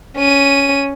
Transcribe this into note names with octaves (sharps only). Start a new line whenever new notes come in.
C#4 D#7